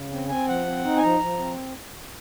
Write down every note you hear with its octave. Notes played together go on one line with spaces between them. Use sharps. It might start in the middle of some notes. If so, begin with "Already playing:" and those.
Already playing: C#3
C4
C4 G#5
F3 F#5
C4
D#4
G#5
F3 A#5
F3
C4